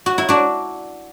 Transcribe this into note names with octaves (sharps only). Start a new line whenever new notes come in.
F#4
E4
D4 F#4